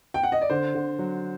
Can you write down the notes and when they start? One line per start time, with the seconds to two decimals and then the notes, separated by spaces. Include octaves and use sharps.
0.14 G5
0.23 F#5
0.32 D#5
0.41 D5
0.50 D3 C5
0.75 D3
0.99 F#3